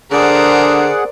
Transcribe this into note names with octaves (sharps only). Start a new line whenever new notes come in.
D3 G#4 A#4 C5 D5 F#5